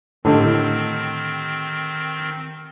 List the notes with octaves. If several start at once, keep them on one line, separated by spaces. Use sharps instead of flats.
A2 D3 D#3 C4 G4 D#5